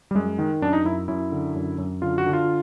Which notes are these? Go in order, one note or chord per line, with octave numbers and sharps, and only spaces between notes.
G3
F#2 G#3
D#3
F#2 D4
D#4
F#2 E4
F#2 E4
D3
F#2
F#2
D3 F4
F#4
D3
F4